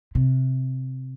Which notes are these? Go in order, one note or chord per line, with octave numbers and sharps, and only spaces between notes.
C3